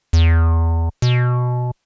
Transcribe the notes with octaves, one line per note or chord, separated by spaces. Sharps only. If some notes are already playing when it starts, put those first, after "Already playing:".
E2
B2